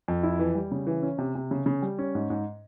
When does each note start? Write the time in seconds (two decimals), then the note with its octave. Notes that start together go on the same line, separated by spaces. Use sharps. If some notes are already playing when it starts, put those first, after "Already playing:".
0.08 F2
0.23 E4
0.39 E3
0.55 G3
0.72 C#3
0.87 E3
1.03 C#4
1.18 C3
1.35 C3
1.51 C#3
1.66 C#3
1.82 G3
1.99 C#4
2.15 G#2
2.30 G#2